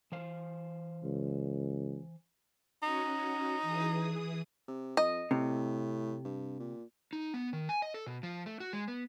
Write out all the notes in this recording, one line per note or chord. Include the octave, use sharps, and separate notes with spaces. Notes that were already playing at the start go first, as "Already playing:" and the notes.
E3 C5 F5
C#2
C#4 D#4 F#4
E3 G#4 D#6
C3
F2 D#5
A2 C3
G2
A#2
D#4
B3
D#3
G#5
D#5
A4
B2
F3
A3
F#4
G#3
B3